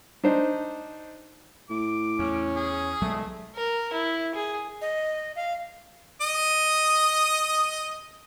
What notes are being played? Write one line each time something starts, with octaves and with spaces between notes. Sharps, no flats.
D4 D#4 C5
A2 D6
E2 C#4
G#4
B1 F#3 G#3 A3
A#4
E4
G#4
D#5
F5
D#5 D#6